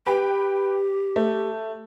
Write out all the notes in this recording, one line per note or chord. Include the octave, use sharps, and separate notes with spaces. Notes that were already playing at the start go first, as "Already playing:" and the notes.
G4 B4 G5
A3